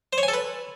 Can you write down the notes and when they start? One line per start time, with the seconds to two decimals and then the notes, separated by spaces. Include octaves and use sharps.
0.13 C5
0.18 C#5
0.23 G#5
0.28 A4
0.34 B4